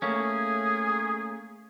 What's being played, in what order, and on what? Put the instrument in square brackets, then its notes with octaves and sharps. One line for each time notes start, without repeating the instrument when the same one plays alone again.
[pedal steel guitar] A3 A#3 C#4 [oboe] G#4